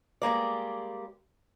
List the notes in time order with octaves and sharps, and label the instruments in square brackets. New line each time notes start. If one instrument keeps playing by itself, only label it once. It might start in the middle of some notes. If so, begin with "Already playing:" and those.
[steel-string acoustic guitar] G3 G#3 A#3 D5